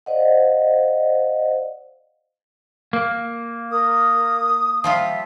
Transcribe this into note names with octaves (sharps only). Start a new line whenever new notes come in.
C5 D5 D#5 F5 F#5
A#3
A#4 D#6
F3 G3 F4 E5